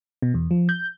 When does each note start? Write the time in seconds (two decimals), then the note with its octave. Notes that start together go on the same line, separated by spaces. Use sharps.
0.22 B2
0.34 E2
0.51 F3
0.69 G6